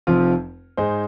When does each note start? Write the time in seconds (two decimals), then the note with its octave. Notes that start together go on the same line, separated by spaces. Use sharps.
0.07 F1 F2 F3 C4 F4
0.77 G#2 G#3 D#4 G#4 C5